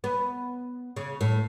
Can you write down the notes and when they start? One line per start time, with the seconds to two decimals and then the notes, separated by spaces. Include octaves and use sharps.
0.04 B3
0.96 C#3
1.21 A2